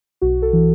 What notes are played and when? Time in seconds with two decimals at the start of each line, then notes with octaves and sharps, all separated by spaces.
0.22 B1 F#4
0.42 A4
0.53 E3